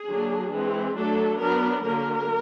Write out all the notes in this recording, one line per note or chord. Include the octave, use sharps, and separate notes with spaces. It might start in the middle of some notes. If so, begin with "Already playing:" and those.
Already playing: G#4
D3 F#3 A#3 D4
E3 G#3 C4
F#3 A3 D4 A4
F#3 B3 D4 A#4
D3 F#3 A#3 A#4